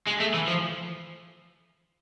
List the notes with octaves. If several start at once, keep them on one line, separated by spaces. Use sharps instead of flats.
G#3
A3
E3
F3